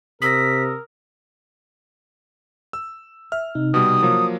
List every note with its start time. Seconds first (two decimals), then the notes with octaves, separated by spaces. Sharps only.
0.22 C3 A#4 D#6 E6 A#6 B6
2.73 E6
3.32 E5 F6
3.55 C3 D#4
3.74 B2 G3 D#6
4.02 F3 F#3 A#3